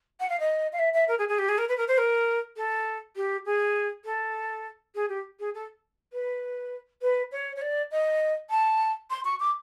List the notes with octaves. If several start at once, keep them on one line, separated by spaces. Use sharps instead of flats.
F#5
F5
D#5
F5
E5
E5
A#4
G#4
G#4
G4
G#4
A#4
B4
A#4
C5
A#4
A4
G4
G#4
A4
G#4
G4
G#4
A4
B4
B4
C#5
C#5
D5
D#5
A5
C6
C#6
D6